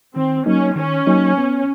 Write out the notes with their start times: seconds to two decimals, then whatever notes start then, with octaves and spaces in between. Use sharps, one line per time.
0.15 D#3 C4
0.46 F#3 A#3 C#4 D#4
0.76 D#3 C#4
1.07 F#3 A#3 D#4
1.38 B3